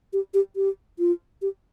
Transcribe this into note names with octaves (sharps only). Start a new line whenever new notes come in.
G4
G4
G4
F4
G4